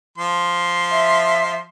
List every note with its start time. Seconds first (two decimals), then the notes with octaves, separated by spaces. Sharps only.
0.18 F3 C6
0.91 E5